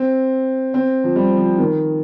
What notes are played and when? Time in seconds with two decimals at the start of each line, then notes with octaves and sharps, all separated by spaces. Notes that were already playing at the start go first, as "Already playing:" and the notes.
Already playing: C4
0.74 C4
1.04 F3
1.16 G3
1.37 F3
1.58 D#3